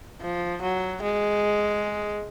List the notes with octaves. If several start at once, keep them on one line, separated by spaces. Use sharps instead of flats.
F3
F#3
G#3